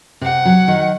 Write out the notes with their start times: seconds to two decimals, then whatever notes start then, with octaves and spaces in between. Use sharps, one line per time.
0.21 C3 F#5
0.45 F#3
0.68 D#3